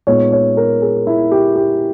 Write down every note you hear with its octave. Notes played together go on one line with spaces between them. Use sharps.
A#2 G#3 B3 D#4 C#5
C#5
A#4
G#4
E4
G4
G4